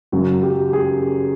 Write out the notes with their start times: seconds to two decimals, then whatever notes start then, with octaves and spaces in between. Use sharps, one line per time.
0.12 F#2 C#3 F#3 F#4
0.43 G4
0.73 G#4